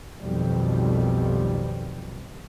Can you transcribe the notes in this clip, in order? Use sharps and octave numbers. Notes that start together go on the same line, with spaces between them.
B1 F2 B2 D#3 F3 G3